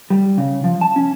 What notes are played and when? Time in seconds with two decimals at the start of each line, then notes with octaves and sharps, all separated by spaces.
0.10 G3
0.38 C#3
0.64 F3
0.81 A5
0.96 C#4